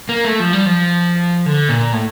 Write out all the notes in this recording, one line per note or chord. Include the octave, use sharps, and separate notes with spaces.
A#3
A3
F3
G3
F3
D3
A#2
A2